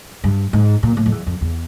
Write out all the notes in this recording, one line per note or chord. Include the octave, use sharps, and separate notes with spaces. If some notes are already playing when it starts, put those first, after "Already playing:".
G2
G#2
A#2
A2
F2
E2
F2
E2